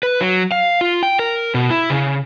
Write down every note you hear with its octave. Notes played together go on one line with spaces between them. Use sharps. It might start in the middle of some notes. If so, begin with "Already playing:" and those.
B4
F#3
F5
F4
G5
A#4
B2
E4
C#3